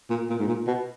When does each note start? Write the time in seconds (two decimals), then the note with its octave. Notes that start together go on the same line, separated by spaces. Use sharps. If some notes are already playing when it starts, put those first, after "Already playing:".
0.10 A#2
0.29 A#2
0.39 G#2
0.48 A#2
0.67 B2